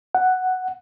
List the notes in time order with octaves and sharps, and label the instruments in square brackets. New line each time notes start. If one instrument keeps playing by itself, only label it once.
[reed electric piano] F#5